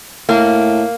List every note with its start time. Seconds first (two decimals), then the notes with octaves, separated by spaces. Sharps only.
0.29 A2 A#3